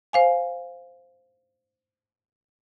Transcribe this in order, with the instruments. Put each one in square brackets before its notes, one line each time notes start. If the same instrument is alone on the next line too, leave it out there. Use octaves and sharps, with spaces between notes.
[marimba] C5 F5 G#5